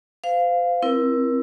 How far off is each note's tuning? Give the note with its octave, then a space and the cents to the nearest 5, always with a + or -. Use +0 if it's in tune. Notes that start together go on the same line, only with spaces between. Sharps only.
C5 -35 F5 +0
C4 +5 E4 +10 A#4 +30